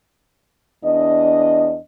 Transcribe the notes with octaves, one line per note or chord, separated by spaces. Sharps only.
E2 D4 D#5